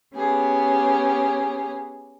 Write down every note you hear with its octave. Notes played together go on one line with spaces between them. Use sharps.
B3 C#4 G4 G#4